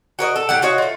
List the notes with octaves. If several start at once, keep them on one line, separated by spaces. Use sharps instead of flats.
F#4 A#4 C#5 D#5
A4
A2 G3 G4 F#5
F4 F#4 C#5 D#5
A3 F4